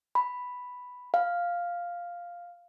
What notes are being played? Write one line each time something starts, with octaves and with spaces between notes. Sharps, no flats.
B5
F5